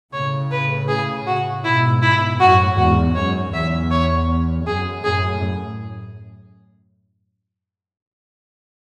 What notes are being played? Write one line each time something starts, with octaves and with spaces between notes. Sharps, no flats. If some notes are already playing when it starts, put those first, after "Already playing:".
A2 C#3 C#5
B4
G#4
F#4
G#2 B2 E4
E4
F#2 A2 F#4
E2 G#2 F#4
F#2 C#5
E2 E5
C#5
F#2 G#4
F#2 A2 G#4